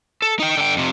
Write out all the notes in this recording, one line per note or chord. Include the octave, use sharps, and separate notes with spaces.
A4
D#4 G5
D3 G5
F2 C3